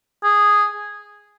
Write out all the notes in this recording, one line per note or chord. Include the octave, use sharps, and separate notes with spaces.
G#4